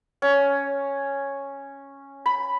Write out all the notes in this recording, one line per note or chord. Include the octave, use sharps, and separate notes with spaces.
C#4
B5